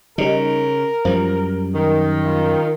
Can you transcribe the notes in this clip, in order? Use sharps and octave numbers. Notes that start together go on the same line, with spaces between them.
C#3 G3 D#4 A#4
F#2 F3 G3
D#3
F4